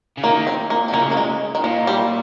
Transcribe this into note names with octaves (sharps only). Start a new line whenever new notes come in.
C#3
D#3 A#3
C4
A#3
C4
C#3 A#3
A#3
G#3
D#3
A#2 F3
G3